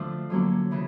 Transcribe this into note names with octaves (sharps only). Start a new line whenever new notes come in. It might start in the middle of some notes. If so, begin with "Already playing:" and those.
Already playing: D3 F3 A3 D4 F4
D3 F#3 A#3 C#4
C#3 E3